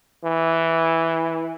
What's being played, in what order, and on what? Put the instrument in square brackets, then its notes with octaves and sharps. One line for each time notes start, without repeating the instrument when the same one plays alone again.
[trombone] E3